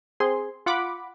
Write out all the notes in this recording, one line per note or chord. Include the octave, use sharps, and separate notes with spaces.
C4 G#4 C6
F4 F#5 B5 D6